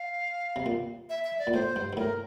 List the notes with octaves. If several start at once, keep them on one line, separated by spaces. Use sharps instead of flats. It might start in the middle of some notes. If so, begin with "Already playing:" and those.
Already playing: F5
C3
A#2
E5
E5
D5
A#2
A2 C5
G2
G2
A2 A#4